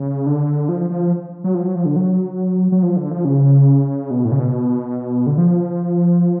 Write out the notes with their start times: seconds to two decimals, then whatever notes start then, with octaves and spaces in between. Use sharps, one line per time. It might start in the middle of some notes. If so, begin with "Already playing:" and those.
Already playing: C#3
0.26 D3
0.69 F3
0.90 F3
1.44 F#3
1.55 F3
1.65 F#3
1.75 F3
1.85 D3
1.96 F#3
2.72 F#3
2.83 F3
2.96 D3
3.11 F3
3.25 C#3
4.11 B2
4.25 A2
4.32 C#3
4.39 B2
5.27 D3
5.38 F3